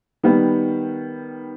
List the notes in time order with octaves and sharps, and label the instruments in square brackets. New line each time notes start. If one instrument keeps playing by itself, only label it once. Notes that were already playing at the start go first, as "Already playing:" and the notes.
[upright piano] D#3 G3 B3